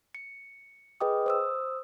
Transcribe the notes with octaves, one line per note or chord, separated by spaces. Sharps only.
C#7
G#4 B4 D#5 G5 D6 D#6
C5 D#6 E6